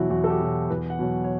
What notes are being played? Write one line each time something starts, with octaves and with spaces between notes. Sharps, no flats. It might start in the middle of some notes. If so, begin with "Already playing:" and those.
Already playing: E2 B2 F#3 E4 F#4
E2 F#4
A4
G4
B2 F#3
E2 B4
F#5
B2 F#3
C#5